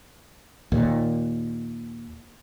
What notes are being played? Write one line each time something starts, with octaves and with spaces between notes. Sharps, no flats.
D#2 A#2